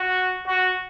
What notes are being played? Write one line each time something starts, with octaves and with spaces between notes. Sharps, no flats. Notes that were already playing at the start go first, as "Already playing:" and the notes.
Already playing: F#4
F#4